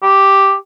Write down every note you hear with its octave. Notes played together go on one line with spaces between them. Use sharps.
G4